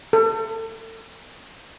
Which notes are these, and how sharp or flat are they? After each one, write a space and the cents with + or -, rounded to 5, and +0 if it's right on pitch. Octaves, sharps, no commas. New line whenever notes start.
A4 +35